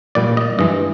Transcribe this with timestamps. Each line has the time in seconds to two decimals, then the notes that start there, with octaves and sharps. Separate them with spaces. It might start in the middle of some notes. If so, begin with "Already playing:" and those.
0.15 A#2 G3 D5
0.37 D#5
0.59 G2 E3 G#3 D#5